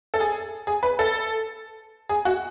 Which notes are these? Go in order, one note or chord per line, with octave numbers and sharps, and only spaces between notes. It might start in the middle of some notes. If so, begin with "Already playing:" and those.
A4
G#4
G#4
B4
A4
G#4
F#4